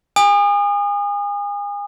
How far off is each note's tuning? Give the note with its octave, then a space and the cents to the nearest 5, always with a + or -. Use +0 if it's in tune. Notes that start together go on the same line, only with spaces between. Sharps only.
G#5 -35 D#6 -30